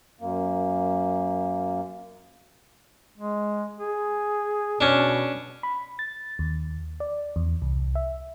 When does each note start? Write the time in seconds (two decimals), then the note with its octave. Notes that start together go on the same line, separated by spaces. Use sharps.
0.21 F#2 A#3
3.17 G#3
3.78 G#4
4.81 B2 C#4 D4
5.63 B5
5.99 A6
6.39 D#2
7.00 D5
7.36 E2
7.62 C2
7.95 E5